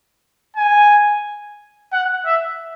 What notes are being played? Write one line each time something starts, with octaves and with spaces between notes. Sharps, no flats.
G#5
F#5
E5